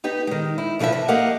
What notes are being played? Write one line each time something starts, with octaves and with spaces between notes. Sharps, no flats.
B3 D#4 G4
D#3 G#3
E4
B2 F3 G#4 B4 E5
C3
A#3 G4 A#4 D#5 F5 F#5